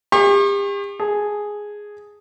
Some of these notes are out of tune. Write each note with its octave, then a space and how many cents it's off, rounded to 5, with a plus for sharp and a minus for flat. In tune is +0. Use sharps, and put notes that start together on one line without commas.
G4 +40 C#6 -40
G#4 +0 A5 +0